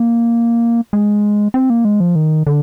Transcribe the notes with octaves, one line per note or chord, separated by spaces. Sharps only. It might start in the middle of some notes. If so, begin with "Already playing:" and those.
Already playing: A#3
G#3
C4
A#3
G#3
F3
D#3
D3